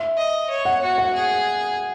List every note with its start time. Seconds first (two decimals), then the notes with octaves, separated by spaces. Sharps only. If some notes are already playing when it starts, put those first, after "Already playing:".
Already playing: E5
0.18 D#5
0.50 C#5
0.65 F#5
0.82 F#4
0.98 F#5
1.14 G#4